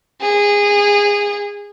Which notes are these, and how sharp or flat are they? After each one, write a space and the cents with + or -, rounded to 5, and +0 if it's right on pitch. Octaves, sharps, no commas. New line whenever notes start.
G#4 -20